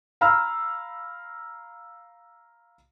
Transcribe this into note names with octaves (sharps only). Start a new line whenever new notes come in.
F5 A#5 B5 E6 F6